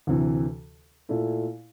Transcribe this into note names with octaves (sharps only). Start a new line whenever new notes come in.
D2 C3 E3
A#2 A3 E4